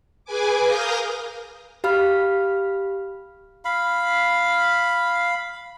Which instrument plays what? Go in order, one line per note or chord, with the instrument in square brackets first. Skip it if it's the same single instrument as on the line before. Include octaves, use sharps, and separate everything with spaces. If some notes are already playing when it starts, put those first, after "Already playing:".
[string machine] G#4 B4 G#5 D6
A#4 F5 D#6 G6 A#6
[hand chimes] G4 F5 B5 F6
[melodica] F5 B5